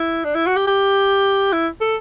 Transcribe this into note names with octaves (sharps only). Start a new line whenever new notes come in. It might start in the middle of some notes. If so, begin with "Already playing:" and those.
Already playing: E4
D4
E4
F#4
G4
G4
E4
A4